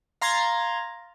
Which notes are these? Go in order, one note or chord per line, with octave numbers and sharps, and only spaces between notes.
F5 A#5 C6 G#6 A6